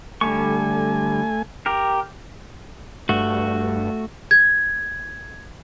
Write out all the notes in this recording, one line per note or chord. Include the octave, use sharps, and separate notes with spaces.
D3 G3 A3 G#5 C#6
G4 A#4
G2 A3 F#4
G#6